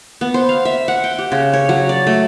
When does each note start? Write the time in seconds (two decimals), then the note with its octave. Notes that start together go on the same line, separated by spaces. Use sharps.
0.21 B3
0.34 C5
0.49 F5
0.65 E5
0.88 F#5
1.04 G5
1.19 G4
1.32 C#3
1.53 C#5
1.69 F#3
1.89 D5
2.07 A3